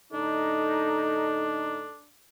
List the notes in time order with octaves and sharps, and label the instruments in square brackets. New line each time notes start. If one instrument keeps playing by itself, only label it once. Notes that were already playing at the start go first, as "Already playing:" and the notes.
[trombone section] A2 D3 D#4 [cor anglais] D4 [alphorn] A4